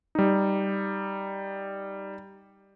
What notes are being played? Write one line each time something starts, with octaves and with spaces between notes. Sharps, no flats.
G3 D#4